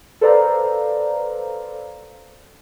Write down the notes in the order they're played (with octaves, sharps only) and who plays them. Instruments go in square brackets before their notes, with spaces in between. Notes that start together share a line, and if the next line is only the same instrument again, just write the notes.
[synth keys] A4 B4 C5 D5 F5 A#5